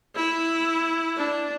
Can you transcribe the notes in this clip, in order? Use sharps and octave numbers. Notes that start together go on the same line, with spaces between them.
E4
D4